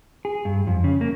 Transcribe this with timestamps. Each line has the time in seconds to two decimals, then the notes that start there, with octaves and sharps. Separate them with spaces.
0.25 G#4
0.45 G2
0.67 F2
0.84 C#3
1.01 A#3